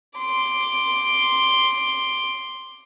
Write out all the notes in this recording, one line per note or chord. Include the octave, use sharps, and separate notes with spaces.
C6 D6